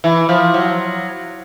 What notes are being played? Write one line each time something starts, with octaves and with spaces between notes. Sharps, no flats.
E3
F3
F#3